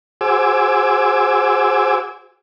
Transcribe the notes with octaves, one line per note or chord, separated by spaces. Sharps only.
F#4 G#4 C5 G#5 D6 E6